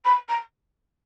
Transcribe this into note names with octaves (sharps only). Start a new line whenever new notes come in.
B5
A#5